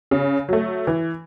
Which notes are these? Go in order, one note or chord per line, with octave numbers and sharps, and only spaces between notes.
C#3
F#3 A3
E3